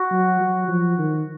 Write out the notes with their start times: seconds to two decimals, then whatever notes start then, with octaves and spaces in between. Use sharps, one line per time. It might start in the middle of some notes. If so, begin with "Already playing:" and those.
Already playing: F#4
0.11 F#3
0.40 F#3
0.68 F3
0.98 D#3